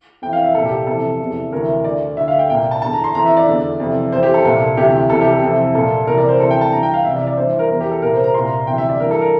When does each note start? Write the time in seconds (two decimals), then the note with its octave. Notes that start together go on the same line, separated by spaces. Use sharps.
0.22 F2 E3 G5
0.33 F5
0.44 E5
0.54 C2 A#2 A4
0.66 G4
0.87 F2 C3 E3 A4
1.20 E2 C3 E3
1.52 D2 C3 E3 A#4
1.84 D2 D3 D5
2.17 D2 D3 E5
2.28 F5
2.39 G5
2.50 C2 A#2 G5
2.71 A5
2.82 E2 D3 A5
2.93 A#5
3.04 C6
3.15 F2 E3 A#5
3.26 E5
3.37 D5
3.47 E2 D3
3.80 F2 C3 E3
4.12 F2 E3 C5
4.23 G4
4.34 A4
4.45 C2 A#2 A4
4.77 D2 C3 E3 G4
5.10 C2 C3 E3 A4
5.21 G4
5.31 A4
5.42 F2 C3 E3
5.75 C2 A#2 A4
6.07 C2 C3 E3 A#4
6.18 D5
6.29 C5
6.40 D2 C3 E3 A4
6.51 G5
6.61 A5
6.72 G2 E3 A#5
6.83 G5
6.94 F5
7.04 C2 C3 E3 E5
7.16 D5
7.27 D5
7.37 G2 E3 C5
7.59 A#4
7.70 E2 E3 A#4
7.80 G4
7.91 A4
8.02 C2 A#2 A#4
8.13 C5
8.24 A#5
8.34 C2 A#2 C6
8.46 A#5
8.67 D2 C3 E3 G5
8.78 E5
8.89 D5
9.00 G2 E3 A#4
9.11 A4
9.21 A#4